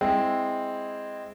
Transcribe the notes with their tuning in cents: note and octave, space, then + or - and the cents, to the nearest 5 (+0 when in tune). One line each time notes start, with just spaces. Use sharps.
G#3 -10 C4 +0 E4 -10